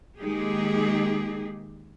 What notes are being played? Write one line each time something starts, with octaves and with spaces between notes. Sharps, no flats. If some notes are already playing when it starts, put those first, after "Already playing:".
D#3 G#3 A#3 D#4 G4 G#4